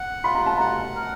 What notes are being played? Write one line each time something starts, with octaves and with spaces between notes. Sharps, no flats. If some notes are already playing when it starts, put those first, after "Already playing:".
Already playing: F#5
F4 B5
A#5
A5
F#5 A#5
A#4